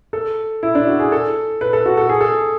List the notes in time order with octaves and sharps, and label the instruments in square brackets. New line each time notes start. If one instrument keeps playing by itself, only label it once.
[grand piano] A4
E4
D4
F#4
G#4
A4
B4
A4
F#4
A4
G#4
A4